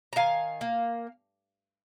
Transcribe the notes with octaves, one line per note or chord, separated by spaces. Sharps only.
A#5
D#3 F5 G#5
A#3